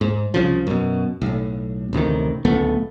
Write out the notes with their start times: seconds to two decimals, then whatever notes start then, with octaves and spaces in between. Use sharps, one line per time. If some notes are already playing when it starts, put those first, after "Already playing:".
0.01 G#2
0.34 C2 C#3 F3
0.67 F#2 B2
1.21 B1 A2
1.93 A1 D2 C3 D#3
2.45 D1 C#2 A3 B3